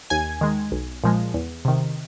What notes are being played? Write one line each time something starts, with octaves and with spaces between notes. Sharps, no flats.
D#2 G#5 G#6
D#3 G#3
B1
A#2 F3 G#3
E2
C3 D#3